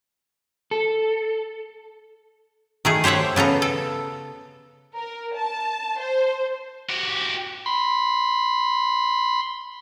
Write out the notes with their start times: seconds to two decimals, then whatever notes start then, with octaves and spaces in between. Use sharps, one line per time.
0.71 A4
2.85 D#3 A3 G#4
3.04 G4 C5 C#5 E5 F#5
3.36 C#3 B3 A4 A#5
3.62 A4
4.94 A#4
5.35 A5
5.99 C5
6.89 F#4 G4
7.66 B5 C6